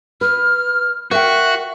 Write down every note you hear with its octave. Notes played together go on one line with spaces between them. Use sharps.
B4 F6
F#4 A#4 E5 G5